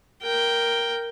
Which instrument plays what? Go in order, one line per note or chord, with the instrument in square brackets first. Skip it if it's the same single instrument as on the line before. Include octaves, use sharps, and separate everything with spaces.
[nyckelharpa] A#4 G5